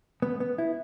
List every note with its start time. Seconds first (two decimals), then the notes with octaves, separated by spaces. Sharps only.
0.22 B3
0.40 B3
0.58 E4